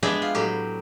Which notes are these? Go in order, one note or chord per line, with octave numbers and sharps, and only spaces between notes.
G#3 B3 D4 G#4 E5 G5
F4
A2 F#3 G4